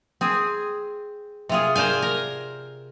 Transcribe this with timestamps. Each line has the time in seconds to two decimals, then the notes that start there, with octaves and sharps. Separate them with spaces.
0.21 C4 G#4
1.49 C3 F4 G#4
1.76 A#4 C5 D5 F5 G#5
2.02 A#4